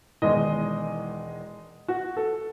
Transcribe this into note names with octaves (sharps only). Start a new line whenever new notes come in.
E1 E2 D#3 G#3 D#5
F#4
A4